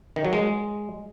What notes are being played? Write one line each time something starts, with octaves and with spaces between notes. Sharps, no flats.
D#3
F#3
G#3